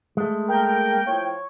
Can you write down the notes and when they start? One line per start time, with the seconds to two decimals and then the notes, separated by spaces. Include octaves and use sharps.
0.17 G#3 A3
0.48 A#3 A#4 G5
1.07 A2 F3 C#5